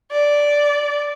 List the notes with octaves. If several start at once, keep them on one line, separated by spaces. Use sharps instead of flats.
D5